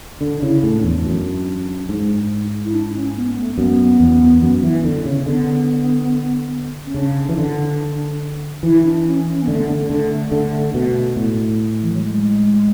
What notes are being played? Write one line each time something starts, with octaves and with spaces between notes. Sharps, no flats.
D3 D4
C#3 E4
A2 D4
E2 D4
F#2
G#2
E4
D4
C#4
B3
A3
A3
F#2 B3
E2
F#2
E3
D3
C#3
D3 B3
C#4
C#3 D4
E3
D3
E3 E4
D4
C#4
C#4
B3
D3 A3
D3
D3
D3
B2
A2
E3
F#3
G#3